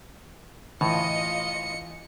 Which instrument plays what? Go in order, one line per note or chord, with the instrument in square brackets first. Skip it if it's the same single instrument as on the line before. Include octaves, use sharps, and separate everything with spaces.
[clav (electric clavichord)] A2 [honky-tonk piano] E3 [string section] F4 D#5 [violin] C#7